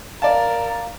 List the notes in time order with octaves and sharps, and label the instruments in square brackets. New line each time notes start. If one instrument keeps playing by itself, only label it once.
[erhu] A#4 [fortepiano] D5 A5 [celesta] F5